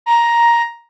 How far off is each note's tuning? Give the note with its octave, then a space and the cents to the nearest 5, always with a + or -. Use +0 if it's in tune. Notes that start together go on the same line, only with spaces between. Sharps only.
A#5 +10